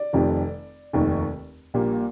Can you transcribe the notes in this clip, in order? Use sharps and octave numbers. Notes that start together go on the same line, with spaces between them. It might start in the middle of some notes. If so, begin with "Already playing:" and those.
Already playing: D5
F1 F2 D#3 G3
F1 D#2 D#3 A#3
A#1 A#2 G3 A#3